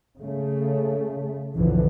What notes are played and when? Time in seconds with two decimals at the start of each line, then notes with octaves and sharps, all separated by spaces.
0.18 C#3 A3
1.55 B1 F2 D3 E3 F3